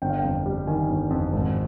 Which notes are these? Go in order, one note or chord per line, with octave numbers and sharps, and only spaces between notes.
G1 G5
F5
F2 G5
G3
D#3 G#5
G1
F2
G#1